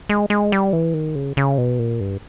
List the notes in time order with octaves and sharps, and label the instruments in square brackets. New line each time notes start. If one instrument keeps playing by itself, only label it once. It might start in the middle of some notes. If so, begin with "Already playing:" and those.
[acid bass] G#3
G#3
G3
E3
D#3
C#3
C#3
B2
A#2
G2